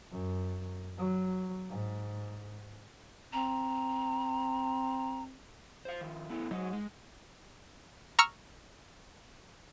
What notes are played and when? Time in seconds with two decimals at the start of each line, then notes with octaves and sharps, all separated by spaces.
0.11 F#2
0.98 F#3
1.70 G#2
3.33 C4 A#5
5.85 C5 F5
6.01 D#3 F3
6.30 A3 B3 E4
6.51 G#2 F#3 D#4
6.73 G#3
8.19 A#5 C#6 E6 F6